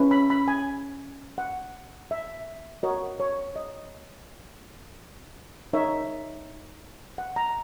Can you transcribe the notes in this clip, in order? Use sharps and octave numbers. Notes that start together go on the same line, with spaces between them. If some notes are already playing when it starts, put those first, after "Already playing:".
Already playing: C#4 E4 B4
B5
B5
G#5
F#5
E5
F#4 A#4 C#5 D#5
C#5
D#5
D#4 A#4 C#5 E5
F#5
A#5